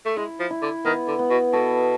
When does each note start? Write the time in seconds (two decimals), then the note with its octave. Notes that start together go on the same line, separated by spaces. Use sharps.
0.06 A3
0.17 G#3 E4
0.40 F3
0.51 E4
0.62 D3
0.85 D#3 B3
1.08 D3
1.19 B3
1.30 B2
1.53 B2 A4